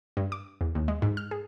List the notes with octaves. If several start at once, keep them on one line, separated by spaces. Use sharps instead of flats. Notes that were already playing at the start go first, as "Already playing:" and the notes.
G2
D6
E2
D#2
G#3
G#2
F6
G#4